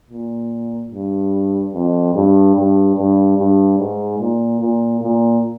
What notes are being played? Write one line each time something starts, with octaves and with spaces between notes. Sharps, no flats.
A#2
G2
F2
G2
G2
G2
G2
G#2
A#2
A#2
A#2